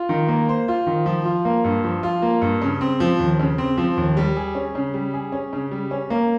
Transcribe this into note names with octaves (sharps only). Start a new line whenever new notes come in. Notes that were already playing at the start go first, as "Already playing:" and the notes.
Already playing: F4
D#3
A#3
C5
F4
D#3
F3
F4
A#3
G2
F3
F4
A#3
G2
C#3
C4
F3
D#2
C#3
C4
F3
D#2
G3
G#4
C#4
C#3
G3
G#4
C#4
C#3
G3
C#4
A#3